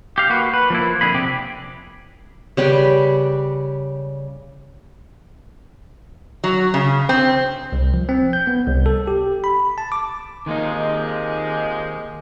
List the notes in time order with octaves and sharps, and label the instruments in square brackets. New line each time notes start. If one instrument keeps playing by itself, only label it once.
[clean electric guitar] G4 F5
A#3 F#4 B4
B4
F3 A#3 E4
F2 D3 G#4 B5
C3 G4
[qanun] C#3 G3 B4
[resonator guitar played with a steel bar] F#3
C#3
C4
[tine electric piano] C2
F3
C4
G6
B3
C2
A4
G4
B5
A5
D6
[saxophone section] C3 F3 G#3 [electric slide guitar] D#3 A#3 D#4